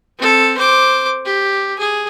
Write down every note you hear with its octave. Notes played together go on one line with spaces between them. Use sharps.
C4 A4
C5 D6
G4
G#4